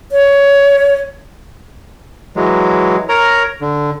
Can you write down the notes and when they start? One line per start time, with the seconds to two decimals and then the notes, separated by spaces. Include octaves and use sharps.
0.12 C#5
2.36 E3 F#3 G#3
3.09 A#4 C#5 A#5
3.61 D3